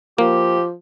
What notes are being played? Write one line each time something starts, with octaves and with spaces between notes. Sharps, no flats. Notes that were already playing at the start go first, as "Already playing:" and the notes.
F3 A#3 G4